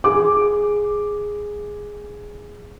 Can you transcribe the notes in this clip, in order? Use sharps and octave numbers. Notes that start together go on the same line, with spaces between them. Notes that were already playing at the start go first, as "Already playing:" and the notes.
G#4 D6